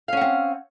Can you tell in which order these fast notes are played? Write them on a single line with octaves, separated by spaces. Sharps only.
F5 C#4 F#5 C4